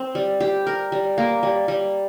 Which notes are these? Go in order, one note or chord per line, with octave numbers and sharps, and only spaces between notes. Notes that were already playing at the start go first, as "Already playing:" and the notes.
Already playing: C4
G3
G4
A#4
G3
A#3
G3
G3